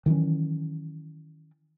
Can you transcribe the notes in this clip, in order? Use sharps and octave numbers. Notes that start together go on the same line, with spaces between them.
D#3 E3 F#3 C#4